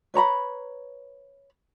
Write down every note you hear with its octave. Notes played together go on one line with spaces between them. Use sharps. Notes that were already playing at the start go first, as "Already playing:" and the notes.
B4 C#5 A#5 B5